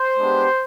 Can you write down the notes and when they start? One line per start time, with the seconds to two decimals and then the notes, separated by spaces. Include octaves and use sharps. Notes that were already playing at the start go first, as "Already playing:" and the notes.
Already playing: C5
0.17 G#3 B3 D4 G4